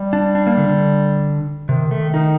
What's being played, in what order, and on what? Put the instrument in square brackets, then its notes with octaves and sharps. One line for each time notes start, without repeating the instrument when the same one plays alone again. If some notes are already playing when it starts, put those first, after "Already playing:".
Already playing: [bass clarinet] G3
[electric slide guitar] D4
D4
A#3
D3
D3
[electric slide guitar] C3 [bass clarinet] D#3
[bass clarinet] D#3 [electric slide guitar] A3
[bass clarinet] D#3 [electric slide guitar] D#4